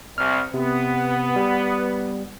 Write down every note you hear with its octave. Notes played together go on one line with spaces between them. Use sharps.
C2 F6
C3 B3
G3